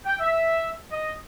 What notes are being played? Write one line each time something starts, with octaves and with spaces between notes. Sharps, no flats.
G5
E5
D#5